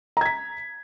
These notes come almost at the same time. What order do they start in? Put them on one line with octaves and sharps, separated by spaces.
A#5 G#6 B6